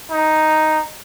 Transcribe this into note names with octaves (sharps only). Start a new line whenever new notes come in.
D#4